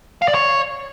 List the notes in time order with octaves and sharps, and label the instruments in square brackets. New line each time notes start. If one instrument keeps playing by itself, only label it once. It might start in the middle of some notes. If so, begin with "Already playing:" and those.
[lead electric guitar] F5
D5
C#5